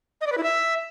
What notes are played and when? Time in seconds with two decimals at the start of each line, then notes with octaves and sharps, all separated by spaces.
0.21 D#5
0.27 D5
0.32 B4
0.38 E4
0.43 E5